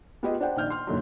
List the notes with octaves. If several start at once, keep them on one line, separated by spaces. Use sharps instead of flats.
B3 F4 G4 G#4 B4 D#5
D4 C5 D5 F#5 G5
A#1 D#3 D5 F6 G6
C6 F6
F#1 A#2 D3 D#3 F#3